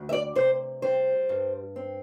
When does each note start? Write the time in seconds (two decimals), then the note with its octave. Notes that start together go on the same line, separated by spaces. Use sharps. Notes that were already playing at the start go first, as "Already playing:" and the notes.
Already playing: D2
0.09 E5
0.13 D5
0.35 C3 C5
0.82 G3 C5
1.29 G2
1.76 C4